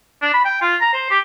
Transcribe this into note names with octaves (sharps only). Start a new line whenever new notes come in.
D4
B5
G5
F4
A#5
C5
G4